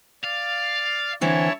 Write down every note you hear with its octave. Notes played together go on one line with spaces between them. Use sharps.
D5 F5
D3 E3 C4 E4 C#5 A5